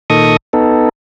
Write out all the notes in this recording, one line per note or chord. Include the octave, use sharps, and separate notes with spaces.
A#2 D#3 A4 D#5 C#6 D#6
B3 D#4 A4